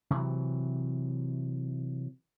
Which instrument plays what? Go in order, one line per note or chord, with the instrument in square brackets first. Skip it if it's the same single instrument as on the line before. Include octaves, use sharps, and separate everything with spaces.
[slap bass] C3 E3 F#3